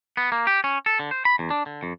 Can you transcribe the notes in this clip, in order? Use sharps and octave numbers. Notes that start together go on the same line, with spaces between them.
B3
A#3
G4
C#4
A4
D3
C5
B5
E2
D4
D3
F2